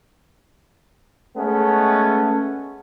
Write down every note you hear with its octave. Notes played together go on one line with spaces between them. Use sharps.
G#3 A3 B3 C#4